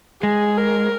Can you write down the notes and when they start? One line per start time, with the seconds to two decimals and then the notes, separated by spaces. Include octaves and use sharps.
0.23 G#3 G#4
0.58 A#4